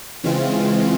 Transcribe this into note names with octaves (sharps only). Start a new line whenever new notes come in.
C#3 E3 G#3 C4 F4